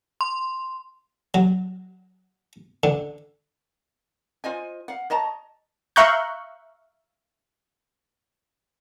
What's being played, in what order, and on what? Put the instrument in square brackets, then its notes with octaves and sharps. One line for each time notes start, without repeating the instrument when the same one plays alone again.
[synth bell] C6
[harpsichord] F#3
D3
[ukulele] F4 C5 D#5 G#5
F5 F#5
C#5 D#5 A5 A#5
[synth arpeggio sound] E5 F5 A#5 C#6 F#6 G6